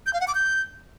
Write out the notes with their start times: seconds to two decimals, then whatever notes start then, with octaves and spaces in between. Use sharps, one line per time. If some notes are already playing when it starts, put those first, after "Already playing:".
0.06 G6
0.13 F5
0.20 F#5
0.28 D6
0.35 G6